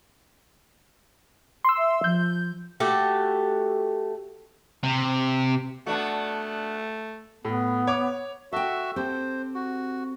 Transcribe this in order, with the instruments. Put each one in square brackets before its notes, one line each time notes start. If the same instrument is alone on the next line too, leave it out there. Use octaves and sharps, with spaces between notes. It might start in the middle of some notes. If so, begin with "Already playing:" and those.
[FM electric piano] C6 E6
[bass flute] E5
[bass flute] F3 [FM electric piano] G6
[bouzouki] A3 F#4 G4 A4
[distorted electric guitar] C3
[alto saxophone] A3 [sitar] B3 D4 F#4
[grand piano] A2 [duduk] B3
[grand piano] C#5 D6
[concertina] F#4 E5 [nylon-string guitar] A4 G5
[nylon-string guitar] C4 G4 A4 [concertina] C5
[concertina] F#4